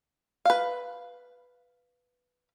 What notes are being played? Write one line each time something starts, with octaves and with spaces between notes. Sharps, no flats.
B4 F5